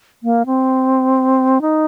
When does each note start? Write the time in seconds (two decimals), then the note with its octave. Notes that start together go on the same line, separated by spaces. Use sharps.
0.23 A#3
0.46 C4
1.61 D#4